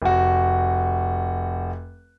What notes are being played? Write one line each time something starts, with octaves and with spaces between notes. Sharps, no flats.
F1 F#4